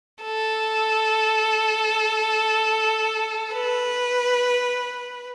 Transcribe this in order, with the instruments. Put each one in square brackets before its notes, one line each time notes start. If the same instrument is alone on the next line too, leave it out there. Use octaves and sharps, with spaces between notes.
[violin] A4
B4